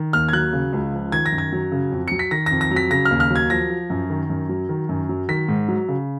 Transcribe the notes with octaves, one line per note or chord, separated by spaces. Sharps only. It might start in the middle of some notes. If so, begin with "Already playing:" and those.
Already playing: D#3
D#2 F6
G#6
F#3 F#6
C#3
C#2
F3
D#3 G#6
A#6
F#2
G#6
F#3
C#3
F2
F#3 C#7
B6
D#3 A#6
F2 A#6
A#6
F#3
B6
C#3 A#6
F6
D#2
F6
F#3
G#6
F3 A#6
F3
F#2
D#3
F#2
F#3
D#3
F#2
F#3
D#3 B6
G#2
F#3
C#3